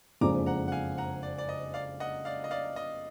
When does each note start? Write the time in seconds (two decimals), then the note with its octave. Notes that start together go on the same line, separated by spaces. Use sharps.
0.21 F#1 F2 F3 G#3 D4 A#5 D6
0.46 F#5 A#5
0.68 F#5
0.72 F5 G#5
0.98 F#5 A#5
1.23 D5
1.38 D5
1.49 D#5
1.74 D5 F5
2.00 D#5 F#5
2.25 D5 F5
2.44 D#5
2.51 D5 F5
2.76 D#5